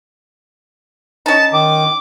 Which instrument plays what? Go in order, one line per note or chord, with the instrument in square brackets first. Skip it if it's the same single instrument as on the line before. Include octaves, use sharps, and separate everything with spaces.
[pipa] C#4 D#4 [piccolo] A5
[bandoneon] D#3 [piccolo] D6